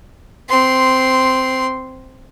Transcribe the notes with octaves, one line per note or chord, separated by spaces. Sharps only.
C4 C6